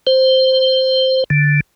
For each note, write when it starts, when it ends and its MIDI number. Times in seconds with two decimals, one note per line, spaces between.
0.07 1.24 72
1.30 1.61 50